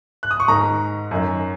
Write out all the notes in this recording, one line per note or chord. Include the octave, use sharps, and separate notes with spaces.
F#6
D#6
C#6
G#2 D#3 A#5
F#2 D#3